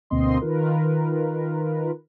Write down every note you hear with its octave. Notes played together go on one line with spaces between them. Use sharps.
D2 B2 A#3 C4 D#5 C6
D#3 F4 A#4 B4